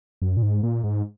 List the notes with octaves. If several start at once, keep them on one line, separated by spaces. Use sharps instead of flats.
F#2
A#2
G#2
A#2
G#2